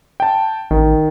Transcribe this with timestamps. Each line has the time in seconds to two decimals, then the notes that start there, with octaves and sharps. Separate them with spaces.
0.20 G5 A5
0.71 A1 D#3